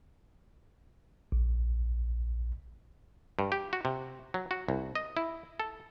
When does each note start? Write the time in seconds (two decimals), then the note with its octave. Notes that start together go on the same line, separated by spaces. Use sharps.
1.32 A#1
3.39 G2
3.52 G4
3.73 F#4
3.85 C3
4.34 F#3
4.51 F#4
4.69 C2
4.95 D#5
5.17 E4
5.60 A4